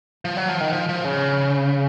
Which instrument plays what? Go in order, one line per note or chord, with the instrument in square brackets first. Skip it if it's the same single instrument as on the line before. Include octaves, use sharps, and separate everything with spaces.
[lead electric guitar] F3
F#3
F3
D#3
F3
F3
C#3